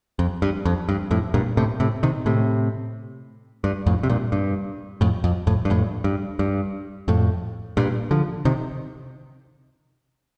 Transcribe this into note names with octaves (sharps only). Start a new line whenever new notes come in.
F2
G2
F2
G2
F2 A2
G2 A#2
A2 C3
A2 C3
C3 D#3
A2 C3
G2
F2 A2
C3
G2 A#2
G2
F2 A2
F2
F2 A2
G2
F2 A2
G2
G2
F2 A2
G2 A#2
D3 F3
C3 D#3